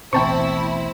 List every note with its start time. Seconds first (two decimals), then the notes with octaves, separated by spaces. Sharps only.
0.13 A1 D2 B2 C4 E4 G5 A5 C#6